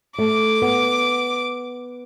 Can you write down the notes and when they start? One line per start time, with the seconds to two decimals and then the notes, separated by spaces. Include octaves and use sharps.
0.18 A3 D6
0.62 B3